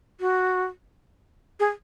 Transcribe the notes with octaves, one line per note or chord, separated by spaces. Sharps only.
F#4
G#4